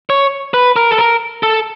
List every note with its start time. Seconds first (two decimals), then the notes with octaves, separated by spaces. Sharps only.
0.10 C#5
0.54 B4
0.76 A#4
0.91 A4
0.98 A#4
1.43 A4